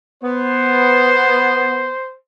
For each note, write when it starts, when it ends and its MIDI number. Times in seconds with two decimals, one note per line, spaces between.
0.23 1.91 59
0.23 2.15 72